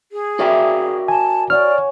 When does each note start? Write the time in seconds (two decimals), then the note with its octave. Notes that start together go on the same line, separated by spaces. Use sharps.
0.12 G#4
0.39 F#4 A#4 D5 E5 G5
1.08 G#5 A5
1.50 C#5 D5 F#5 G#5 F6